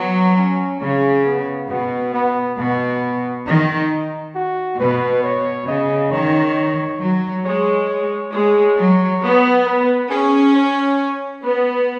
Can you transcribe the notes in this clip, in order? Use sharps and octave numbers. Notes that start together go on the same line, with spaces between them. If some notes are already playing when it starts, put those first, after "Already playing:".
Already playing: F#3 B3
C#4
C#3 C#4
B3
B2 B3
B3
B2 B3
D#3 D#4
F#4
B2 B4
C#5
C#3 D#5
D#3 C#5
F#3
G#3 C#5
C#5
G#3 C#5
F#3
B3
B4
C#4 G#4
C#5
B3 B4